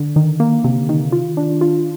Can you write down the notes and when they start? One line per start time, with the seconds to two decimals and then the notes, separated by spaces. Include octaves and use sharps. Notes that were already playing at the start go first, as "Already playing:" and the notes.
Already playing: D3
0.16 D#3
0.40 A#3
0.64 C3
0.89 D#3
1.12 F4
1.37 D4
1.61 F4